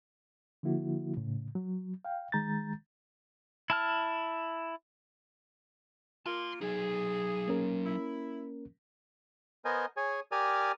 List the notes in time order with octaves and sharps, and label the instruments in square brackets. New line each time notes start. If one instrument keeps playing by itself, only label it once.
[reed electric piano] D3 F3 A#3 E4 F#4
A2 C#3
F#3
F5 G5
D#3 G#3 A#5 G6 A6
[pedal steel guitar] E4 A5 F6
[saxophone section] A#3 F4 [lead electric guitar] A5 C6
[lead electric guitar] F#3 D#4 [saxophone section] G#4
[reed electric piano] A#3 C#4 A#4
[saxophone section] E4
[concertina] B3 A#4 C5 D#5 G#5
G#4 C#5 G#5
G4 A#4 D5 G#5 D#6 F6